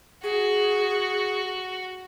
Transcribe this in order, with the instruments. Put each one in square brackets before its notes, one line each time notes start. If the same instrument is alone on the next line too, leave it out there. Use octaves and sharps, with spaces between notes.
[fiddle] F#4 [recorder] G#4